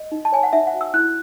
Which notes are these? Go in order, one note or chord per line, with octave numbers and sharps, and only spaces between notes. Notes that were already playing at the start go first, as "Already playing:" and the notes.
Already playing: D#5
D#4
A5
C#5 G#5
F#5
D#4 E5
F#5
F#4
E6
E4 F#6